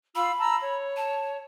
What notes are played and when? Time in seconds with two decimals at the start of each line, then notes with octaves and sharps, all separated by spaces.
0.15 F4 F5 B5 E6
0.38 A5 A#5 E6
0.60 C#5
0.96 A5